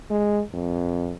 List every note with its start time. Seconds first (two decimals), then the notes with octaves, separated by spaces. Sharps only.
0.11 G#3
0.54 F2